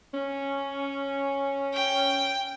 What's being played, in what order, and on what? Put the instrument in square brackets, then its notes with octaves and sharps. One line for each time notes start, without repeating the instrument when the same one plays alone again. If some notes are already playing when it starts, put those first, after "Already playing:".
[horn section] C#4
[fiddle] G5